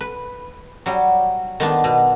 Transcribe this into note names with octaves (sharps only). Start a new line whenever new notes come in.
B4
F#3 G3
D#3 B3 D4
B2